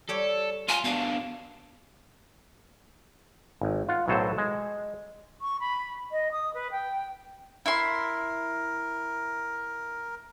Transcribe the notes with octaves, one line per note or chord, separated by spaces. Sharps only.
G3 G4 A4 C#5
F4 G#5
B2 D4 F5
G#1
F4 F#5
B1 A2 F#3 A4 C5
G#3
C#6
B5
D#5
D#6
B4
G5
E4 A#4 C6